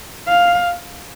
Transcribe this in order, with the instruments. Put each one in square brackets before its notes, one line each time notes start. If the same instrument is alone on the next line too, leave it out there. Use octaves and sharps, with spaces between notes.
[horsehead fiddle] F5